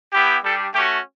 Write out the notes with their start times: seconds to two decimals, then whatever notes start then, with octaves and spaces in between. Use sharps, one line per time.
0.12 B3 E4 G4
0.43 G3 D4 G4 A4
0.74 A3 C#4 F#4 G4